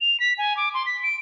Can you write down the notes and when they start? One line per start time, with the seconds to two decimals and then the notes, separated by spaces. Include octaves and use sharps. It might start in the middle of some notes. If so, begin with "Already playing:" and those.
0.01 F7
0.20 B6
0.38 G#5
0.57 D6
0.74 C6
0.86 B6
1.03 D7